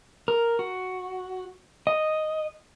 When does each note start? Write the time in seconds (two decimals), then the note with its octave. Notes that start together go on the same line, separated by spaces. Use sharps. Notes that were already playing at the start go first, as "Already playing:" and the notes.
0.28 A#4
0.59 F#4
1.87 D#5